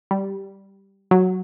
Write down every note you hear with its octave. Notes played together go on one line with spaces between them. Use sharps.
G3
F#3